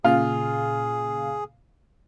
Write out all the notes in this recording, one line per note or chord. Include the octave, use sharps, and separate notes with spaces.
A#2 C#3 F4 G#4 F5